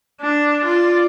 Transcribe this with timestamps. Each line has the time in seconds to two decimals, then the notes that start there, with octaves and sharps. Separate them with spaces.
0.21 D4
0.65 F4 D5